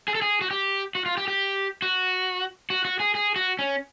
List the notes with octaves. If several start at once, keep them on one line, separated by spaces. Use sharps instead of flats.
G#4
A4
G#4
F#4
G4
F#4
F4
G4
G4
F#4
F#4
F#4
G#4
G#4
F#4
C#4